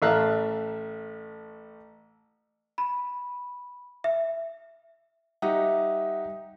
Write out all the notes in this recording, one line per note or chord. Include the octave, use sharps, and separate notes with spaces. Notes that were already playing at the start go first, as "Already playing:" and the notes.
A1 A3 E5 F5 A#5 F#6
B5
E5
G3 D#4 G4 E5 F#5 D#6